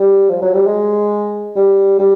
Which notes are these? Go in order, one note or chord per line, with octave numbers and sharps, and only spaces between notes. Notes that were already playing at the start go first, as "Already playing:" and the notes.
Already playing: G3
F3
F#3
G3
G#3
G3
G3